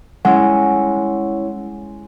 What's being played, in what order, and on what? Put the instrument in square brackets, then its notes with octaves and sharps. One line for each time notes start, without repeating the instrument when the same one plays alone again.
[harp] G#3 [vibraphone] C#4 E4 C#5 [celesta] F#5